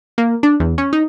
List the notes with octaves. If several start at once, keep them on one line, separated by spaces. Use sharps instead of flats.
A#3
D4
E2
C#4
D#4